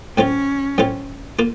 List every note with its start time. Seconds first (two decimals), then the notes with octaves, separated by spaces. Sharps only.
0.17 A2 F#3 C4 C#4 F4
0.78 A2 F#3 C4 F4
1.39 A#3 F4